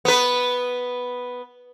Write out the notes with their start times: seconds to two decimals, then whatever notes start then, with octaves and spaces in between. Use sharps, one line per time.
0.05 B3 B4